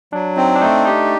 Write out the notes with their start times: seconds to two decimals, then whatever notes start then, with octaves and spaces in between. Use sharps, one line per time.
0.13 F#3 D4
0.37 C4 D#4
0.55 D4
0.61 A3 D#4
0.86 D#4 G4